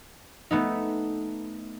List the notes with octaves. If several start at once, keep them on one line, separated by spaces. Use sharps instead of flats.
A3 B3 D#4